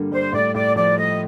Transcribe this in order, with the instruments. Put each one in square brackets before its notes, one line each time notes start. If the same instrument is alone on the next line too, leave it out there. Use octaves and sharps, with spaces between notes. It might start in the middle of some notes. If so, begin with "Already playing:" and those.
Already playing: [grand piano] G2 D3 G3 A#3
[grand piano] G3 [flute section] C5
[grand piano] A2 [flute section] D5
[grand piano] A2 [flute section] D5
[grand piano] F3 [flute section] D5
[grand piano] A3 [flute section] D#5